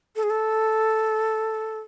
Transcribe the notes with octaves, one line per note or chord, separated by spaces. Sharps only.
A4
G#4
A4